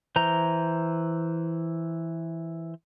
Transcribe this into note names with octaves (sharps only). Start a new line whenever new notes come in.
E3 C5 A#5